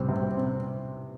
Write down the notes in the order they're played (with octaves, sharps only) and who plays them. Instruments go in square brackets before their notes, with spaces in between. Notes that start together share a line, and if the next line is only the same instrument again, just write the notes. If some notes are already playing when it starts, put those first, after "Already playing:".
Already playing: [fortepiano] C2 G3 C4
C3
C4
C4